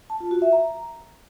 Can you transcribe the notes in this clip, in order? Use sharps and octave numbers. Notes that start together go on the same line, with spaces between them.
A5
F4
F#4
E5
A#5